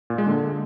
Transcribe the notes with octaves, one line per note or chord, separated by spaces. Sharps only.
A#2
G#3
D3